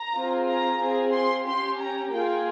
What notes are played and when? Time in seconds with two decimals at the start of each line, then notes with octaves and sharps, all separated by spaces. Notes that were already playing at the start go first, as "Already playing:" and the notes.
Already playing: A#5
0.14 C4 F4 G#4
0.46 A#5
0.79 C4 F4 G#4
1.12 C6
1.45 C#4 G4 C6
1.79 A#5
2.11 A#3 F4 G#4 G5